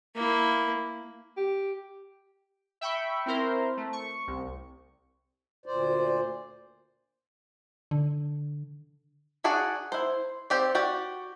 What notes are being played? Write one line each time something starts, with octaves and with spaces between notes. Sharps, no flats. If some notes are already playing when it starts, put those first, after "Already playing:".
A#3 E4
G4
E5 G5 B5 C#6
C4 E4 A#4 C5
A3
C#6
C2
D2 A#2 C5 D5
D3
D4 F#4 G#4 D5 F#5
E4 C5
C4 G4 D5
F#4 G4 D5